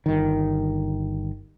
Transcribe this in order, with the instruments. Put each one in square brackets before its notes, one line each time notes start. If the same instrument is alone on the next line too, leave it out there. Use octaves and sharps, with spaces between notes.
[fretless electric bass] G1 D#3